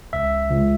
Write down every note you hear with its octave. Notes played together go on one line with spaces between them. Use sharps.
C#2 E5
C#2